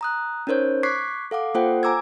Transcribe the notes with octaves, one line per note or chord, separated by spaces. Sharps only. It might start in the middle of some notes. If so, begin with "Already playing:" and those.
A#5 D#6 F#6
C#4 D#4 A#4 C5 C#5
C#6 D6 F#6 G#6 B6 C7
A4 F5 F#5 D6
A#3 F4 A4 C5 F#5 G5
G#5 A#5 D6 E6 G#6